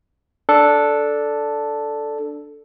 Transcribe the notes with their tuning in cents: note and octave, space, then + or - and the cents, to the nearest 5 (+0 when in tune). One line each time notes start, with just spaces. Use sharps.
D4 +0 A4 +0